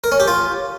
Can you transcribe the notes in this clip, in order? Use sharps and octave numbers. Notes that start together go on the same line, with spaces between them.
A#4
C#4
G4
F4